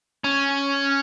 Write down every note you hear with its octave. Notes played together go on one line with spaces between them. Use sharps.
C#4